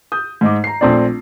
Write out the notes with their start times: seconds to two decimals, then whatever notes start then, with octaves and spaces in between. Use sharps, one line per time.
0.12 D#6 G6
0.41 G#2 D#5 D6
0.64 A#5 C7
0.81 A#1 A3 C4 D4 D5